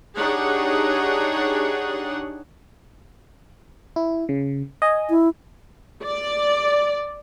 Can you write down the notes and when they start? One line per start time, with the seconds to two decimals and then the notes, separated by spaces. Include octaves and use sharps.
0.17 D4 D#4 G4 G#4 C#5 F#5
3.96 E4
4.29 C#3
4.82 D#5 G#5
5.10 E4
6.04 D5